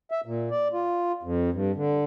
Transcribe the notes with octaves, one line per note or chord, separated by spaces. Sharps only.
E5
A#2
D5
F4
F2
G2
D3